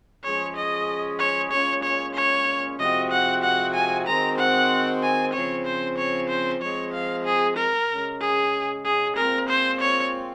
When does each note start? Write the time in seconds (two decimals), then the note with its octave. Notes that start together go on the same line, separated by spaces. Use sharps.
0.24 F3 G#3 C#4 G#4 C#5
0.56 D#5
1.19 C#5
1.51 A#2 G#3 C#4 F4 C#5
1.84 C#5
2.14 C#5
2.79 C3 F3 G#3 C4 F#4 D#5
3.11 F#5
3.43 F#5
3.74 G#5
4.06 D#3 G#3 C4 F#4 A#5
4.38 F#5
5.03 G#5
5.33 C#3 F3 C4 C#5
5.65 C5
5.98 C#5
6.29 C5
6.61 F3 G#3 C4 C#5
6.93 F5
7.25 G#4
7.57 A#4
7.89 C#3 G#3 C#4
8.20 G#4
8.85 G#4
9.16 A#2 G#3 C4 F4 A#4
9.49 C5
9.81 C#5